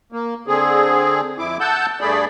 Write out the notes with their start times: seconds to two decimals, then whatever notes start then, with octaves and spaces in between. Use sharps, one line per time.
0.12 A#3
0.47 D3 C4 G#4
1.39 F2 E4 D6
1.60 F#5 A5 E6 G6
2.01 G2 A3 G#4 D5 B5